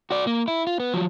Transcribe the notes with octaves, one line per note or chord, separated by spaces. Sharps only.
F#4 D5
A#3
E4
F4
B3
F3 F#3